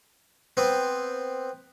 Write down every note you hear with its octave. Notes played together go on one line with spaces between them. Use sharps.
B3 C4